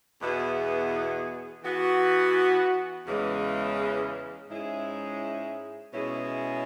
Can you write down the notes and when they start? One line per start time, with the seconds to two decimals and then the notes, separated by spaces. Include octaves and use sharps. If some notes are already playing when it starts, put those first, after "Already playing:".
0.22 E2 B2 B3 E4 G#4
1.64 E3 B3 F#4
3.07 E2 C#3 E3 G#3
4.50 G#2 G#3 C#4 E4 G#4
5.94 B2 G#3 C#4 E4 G#4